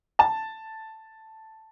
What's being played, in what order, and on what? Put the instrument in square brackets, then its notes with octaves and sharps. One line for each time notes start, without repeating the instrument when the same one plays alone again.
[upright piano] A5